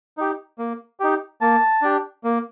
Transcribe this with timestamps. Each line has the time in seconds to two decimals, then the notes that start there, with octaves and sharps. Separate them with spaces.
0.17 D#4 G4
0.58 A#3
1.00 D#4 G4
1.41 A#3 A5
1.82 D4 G4
2.24 A#3